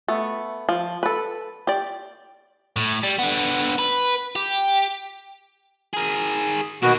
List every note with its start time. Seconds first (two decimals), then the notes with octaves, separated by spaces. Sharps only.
0.08 A3 B3
0.69 F3
1.03 A4 B4
1.67 G4 D5
2.76 A2
3.03 G3
3.19 D3 B3
3.79 B4
4.36 G4
5.94 G#4 A#4
6.83 B2 D#3 A#3 B3 F#4